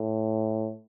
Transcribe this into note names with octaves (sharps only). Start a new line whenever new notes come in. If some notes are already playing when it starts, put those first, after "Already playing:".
Already playing: A2